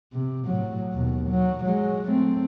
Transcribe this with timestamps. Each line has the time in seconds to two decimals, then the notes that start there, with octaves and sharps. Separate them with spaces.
0.13 C3
0.46 A2 F#3
0.93 D#2 B2
1.30 F#3
1.65 F#3 G#3
2.09 A3 C4